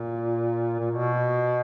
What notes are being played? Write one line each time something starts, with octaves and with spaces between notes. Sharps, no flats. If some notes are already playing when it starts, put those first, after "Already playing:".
Already playing: A#2
A#2
B2